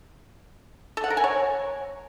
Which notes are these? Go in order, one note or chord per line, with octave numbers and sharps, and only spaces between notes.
A4
F#5
A#4
G#5
C#5